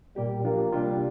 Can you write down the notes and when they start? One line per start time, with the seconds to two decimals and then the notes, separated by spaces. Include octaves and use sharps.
0.16 A#2 G3 A#3 G4
0.44 F3 A#3 D4 F4
0.72 C3 G3 A#3 D4 F4